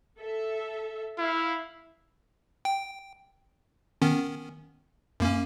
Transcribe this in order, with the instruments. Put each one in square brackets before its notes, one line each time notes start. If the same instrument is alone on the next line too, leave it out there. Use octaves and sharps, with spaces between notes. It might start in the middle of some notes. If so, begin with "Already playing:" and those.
[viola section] A4 E5
[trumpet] E4 [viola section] F5
[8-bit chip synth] G5
D#3 B3 C#4
F#2 A#3 C#4